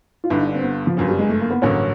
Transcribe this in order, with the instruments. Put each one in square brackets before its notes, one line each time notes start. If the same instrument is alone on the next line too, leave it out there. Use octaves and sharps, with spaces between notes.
[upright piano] F4
[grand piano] G1 G2 D3 [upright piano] E4
[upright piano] D#4
D4
C4
B3
F3
[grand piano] G1 F#2 C#3 [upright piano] F#3
[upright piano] G3
G#3
A3
A#3
B3
[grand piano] A1 G2 D3 F#3 A#3 [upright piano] C#4